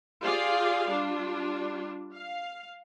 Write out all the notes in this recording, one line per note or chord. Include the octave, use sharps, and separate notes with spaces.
F4 G4 G#4 D5 F5
G3 D4 F4
F5